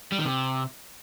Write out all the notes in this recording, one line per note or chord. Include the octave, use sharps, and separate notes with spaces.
G3
D#3
C3